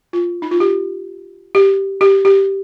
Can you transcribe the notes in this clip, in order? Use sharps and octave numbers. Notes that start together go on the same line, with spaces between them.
F4
D#4
F4
G4
G4
G4
G4